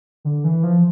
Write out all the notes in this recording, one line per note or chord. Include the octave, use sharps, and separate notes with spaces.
D3
E3
F3